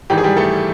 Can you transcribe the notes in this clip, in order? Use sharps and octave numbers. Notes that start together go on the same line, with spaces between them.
G#1 G#2 E3 G4
G#4
G3 G4
A3 A4